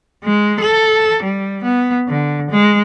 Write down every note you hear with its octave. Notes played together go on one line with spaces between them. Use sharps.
G#3
A4
G3
B3
D3
G#3